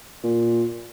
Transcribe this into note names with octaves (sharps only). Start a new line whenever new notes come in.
A#2